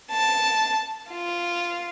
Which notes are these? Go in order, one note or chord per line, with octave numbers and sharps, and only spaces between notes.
A5
F4